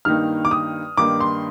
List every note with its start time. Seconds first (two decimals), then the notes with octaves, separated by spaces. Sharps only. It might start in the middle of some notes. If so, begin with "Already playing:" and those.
0.05 G2 D#3 A#3 D#4 F6
0.45 D6
0.51 D#6
0.97 G2 D#3 A#3 D#4 D6
1.20 C6